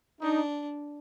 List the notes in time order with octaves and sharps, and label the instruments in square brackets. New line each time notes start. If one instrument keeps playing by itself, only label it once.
[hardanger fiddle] D4 [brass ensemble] D#4